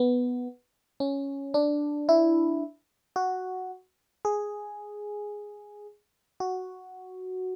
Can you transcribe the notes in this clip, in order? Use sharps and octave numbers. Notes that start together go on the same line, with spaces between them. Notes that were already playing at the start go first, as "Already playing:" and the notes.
Already playing: B3
C#4
D4
E4
F#4
G#4
F#4